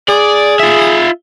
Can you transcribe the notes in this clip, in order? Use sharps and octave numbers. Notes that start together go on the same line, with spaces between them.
G#4 D5
F4 E5